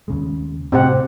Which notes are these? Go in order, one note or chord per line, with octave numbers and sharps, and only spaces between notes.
D#2 C#3 G#3
A2 C3 C4 G4 F#5